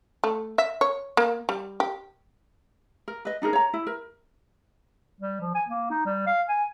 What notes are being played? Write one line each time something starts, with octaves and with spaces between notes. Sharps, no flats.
A3
E5
C#5
A#3
G3
G4
A#4
B4 D#5
D4 D#4 G#4 A#4
C#5 A#5
E4
A#4
G3
F3
G#5
A#3
D#4
G3
F5
G#5